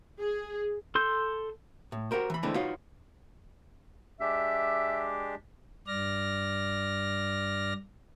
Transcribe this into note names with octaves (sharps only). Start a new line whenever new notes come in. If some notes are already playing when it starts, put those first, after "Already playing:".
G#4
A4 C6 G6
A2
F#4 G4 A#4 C5
E3 B5
D3 E3 G#3 A3 C4
D#4 F4 F#4 B4 C#5
G#3 D4 G4 E5
G2 D5 F6 A#6